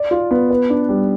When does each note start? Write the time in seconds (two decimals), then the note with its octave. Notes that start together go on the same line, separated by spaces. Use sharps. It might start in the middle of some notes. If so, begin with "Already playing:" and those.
Already playing: D5
0.11 F4
0.31 B3
0.50 B4
0.70 D4
0.89 G3